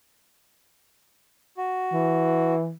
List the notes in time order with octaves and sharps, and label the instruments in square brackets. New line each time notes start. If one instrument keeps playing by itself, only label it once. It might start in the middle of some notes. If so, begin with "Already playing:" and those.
[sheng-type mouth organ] F#4
[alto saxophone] E3